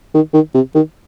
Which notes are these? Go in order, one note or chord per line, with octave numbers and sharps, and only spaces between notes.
D#3
D#3
C3
D#3